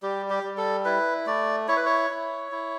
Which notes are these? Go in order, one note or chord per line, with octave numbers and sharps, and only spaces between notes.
G3 G4
G4
G3
A4
E4 B4
A3 D5
E4 C#5
B4
C#5
E4
E4